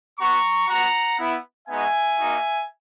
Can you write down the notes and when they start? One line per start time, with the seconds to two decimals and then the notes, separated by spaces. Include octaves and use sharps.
0.19 B3 F#4 A#5 C#6
0.69 B3 F#4 F#5 A#5
1.19 B3 E4
1.68 G#3 B3 D#4 F#4 E5 G#5
2.18 A#3 D#4 F#4